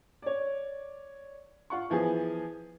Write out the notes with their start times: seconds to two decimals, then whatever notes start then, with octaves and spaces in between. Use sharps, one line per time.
0.22 C#5 D5
1.70 F4 F#5 C#6
1.90 E3 F3 B3 G#4